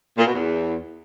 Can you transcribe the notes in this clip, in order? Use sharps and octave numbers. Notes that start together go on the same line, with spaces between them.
A#2
B2
E2